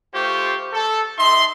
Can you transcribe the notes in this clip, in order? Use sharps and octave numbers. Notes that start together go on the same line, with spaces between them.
A3 F4 G4 C5 C#6
A4
D#4 E5 C6